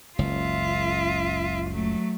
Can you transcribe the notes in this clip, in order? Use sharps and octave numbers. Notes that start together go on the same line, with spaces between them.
F#1 C#2 F4 E5
F#3 A3